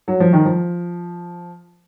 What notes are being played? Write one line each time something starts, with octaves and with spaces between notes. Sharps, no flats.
F#3
F3
D#3
F3